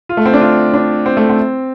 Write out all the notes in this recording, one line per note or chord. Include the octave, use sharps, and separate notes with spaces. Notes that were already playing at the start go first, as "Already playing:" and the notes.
F4
A3
C4
D4
F4
D4
C4
A3
C4